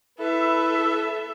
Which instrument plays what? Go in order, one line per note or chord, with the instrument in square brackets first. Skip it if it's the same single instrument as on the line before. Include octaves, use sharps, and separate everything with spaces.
[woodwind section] E4 B4 [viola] A4 E5